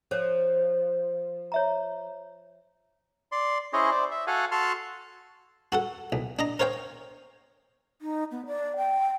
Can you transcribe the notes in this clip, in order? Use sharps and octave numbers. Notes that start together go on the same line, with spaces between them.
F3 A4 C5 C#5
C#5 E5 A#5
D5 C6
C#4 E4 G#4 C5 C#5 D#5
C5 D5
E5
F#4 A4 F5 F#5 G#5
F#4 A4 A5 C6 F6
F#4 A4 F#5
B1
D4 D#5 A#5
A#4 C5 C#5 F5 G5
D#4
B3
D5
G5